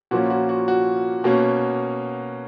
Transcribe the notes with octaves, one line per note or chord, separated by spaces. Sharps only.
A#2 F3 A#3 C#4 F#4
F#4
F#4
F#4
B2 A#3 C#4